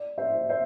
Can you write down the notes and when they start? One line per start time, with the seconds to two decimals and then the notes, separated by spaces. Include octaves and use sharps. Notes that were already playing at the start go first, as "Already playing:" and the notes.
Already playing: D5
0.18 C5 E5
0.49 C5 E5